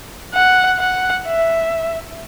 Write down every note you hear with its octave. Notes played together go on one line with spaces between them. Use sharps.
F#5
F#5
E5